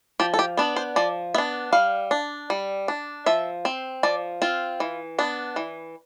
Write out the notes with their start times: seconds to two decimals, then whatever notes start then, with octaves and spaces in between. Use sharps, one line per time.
0.20 F3 G4
0.34 A4
0.39 G4
0.57 B3 D4
0.76 C5
0.96 F3 D5
1.34 B3 D4 E5
1.72 G3 F5
2.11 D4
2.50 G3
2.88 D4
3.26 F3 E5
3.65 C4
4.03 F3 D5
4.42 C4 F4
4.80 E3
5.19 B3 D4
5.56 E3